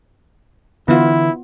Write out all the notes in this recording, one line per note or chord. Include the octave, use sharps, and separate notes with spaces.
D3 E3 B3 E4 F4